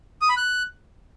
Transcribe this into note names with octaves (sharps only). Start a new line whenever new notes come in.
D#6
B5
F#6